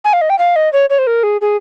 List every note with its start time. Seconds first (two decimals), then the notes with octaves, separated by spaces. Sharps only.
0.04 G#5
0.13 F5
0.21 D#5
0.30 G5
0.38 F5
0.56 D#5
0.73 C#5
0.90 C#5
0.98 C5
1.07 A#4
1.23 G#4
1.41 G#4